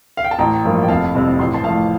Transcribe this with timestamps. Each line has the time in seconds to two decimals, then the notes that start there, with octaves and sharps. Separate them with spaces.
0.17 F5
0.24 G5
0.31 A5
0.39 A1 G5 A#5
0.64 G2 F3 A#3
0.83 G5
0.88 F1 F5 A5
1.15 F2 C3 G3 C4
1.39 A1 C6
1.54 A5 C6
1.64 A2 F3 F5 A5